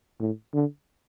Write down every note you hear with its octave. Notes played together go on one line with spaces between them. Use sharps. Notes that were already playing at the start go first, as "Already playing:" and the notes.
A2
D3